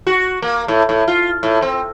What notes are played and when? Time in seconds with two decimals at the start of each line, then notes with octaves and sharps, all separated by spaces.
0.07 F#4
0.42 A#3
0.68 A2
0.89 A2
1.08 F4
1.43 A2
1.62 C4